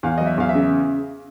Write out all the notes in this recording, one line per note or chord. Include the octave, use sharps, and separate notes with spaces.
E2 F5
F#3 D#5
E5
E2 F5
E5
C#3